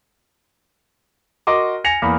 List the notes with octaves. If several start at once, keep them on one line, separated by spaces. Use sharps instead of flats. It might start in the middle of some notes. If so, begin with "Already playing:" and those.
F#4 A#4 D#5 C6 D6
G#5 A#6 C#7 F7
E2 A#3 B5